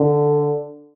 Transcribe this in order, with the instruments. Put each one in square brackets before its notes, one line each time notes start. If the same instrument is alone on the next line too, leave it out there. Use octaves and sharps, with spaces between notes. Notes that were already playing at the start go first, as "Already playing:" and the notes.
Already playing: [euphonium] D3